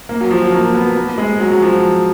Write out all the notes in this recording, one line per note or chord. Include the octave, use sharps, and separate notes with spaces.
A#3
F#3
F3
F#3
A#3
B3
A#3
G#3
F#3
F#3
F3